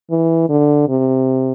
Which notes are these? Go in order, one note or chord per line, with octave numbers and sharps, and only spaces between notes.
E3
D3
C3